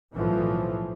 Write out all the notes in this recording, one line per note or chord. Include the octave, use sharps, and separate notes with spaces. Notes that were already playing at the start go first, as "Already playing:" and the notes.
B1 A2 E3 F3